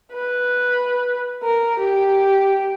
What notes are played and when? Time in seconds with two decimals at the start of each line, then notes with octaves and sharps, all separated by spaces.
0.14 B4
1.44 A#4
1.80 G4